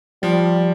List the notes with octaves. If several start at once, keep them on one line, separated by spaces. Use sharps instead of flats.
F3 G3